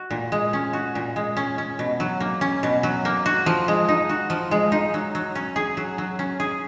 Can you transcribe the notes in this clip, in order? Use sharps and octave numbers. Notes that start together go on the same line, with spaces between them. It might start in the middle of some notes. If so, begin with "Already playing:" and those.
Already playing: F#4
A#2
G#3
C#4
F#4
A#2
G#3
C#4
C#4
B2
F#3
A#3
C#4
B2
F#3
A#3
F#4
F3
G#3
D#4
F#4
F3
G#3
D#4
F#3
F#3
C#4
G#4
F#3
F#3
C#4
G#4